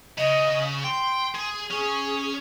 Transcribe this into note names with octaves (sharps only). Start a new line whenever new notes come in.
C#3 D#5
G5 C6
G#4
C#4 G#4